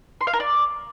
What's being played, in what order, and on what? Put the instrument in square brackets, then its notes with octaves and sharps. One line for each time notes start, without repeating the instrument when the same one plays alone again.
[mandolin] C6
F5
A#4
D5